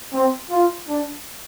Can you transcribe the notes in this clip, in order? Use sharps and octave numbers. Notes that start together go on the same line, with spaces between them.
C4
F4
D4